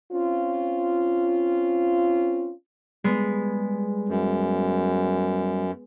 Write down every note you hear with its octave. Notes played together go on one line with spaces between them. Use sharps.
C4 C#4 F4
G3 G#3 B3
F#2